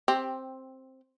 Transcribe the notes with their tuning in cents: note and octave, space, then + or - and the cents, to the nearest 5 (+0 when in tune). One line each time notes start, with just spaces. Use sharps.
C4 +10 G4 +0